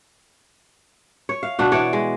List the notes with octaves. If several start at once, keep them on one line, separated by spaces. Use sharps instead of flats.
C#5
F5
B2 D4 F#4
E3 C#5 D5
G#3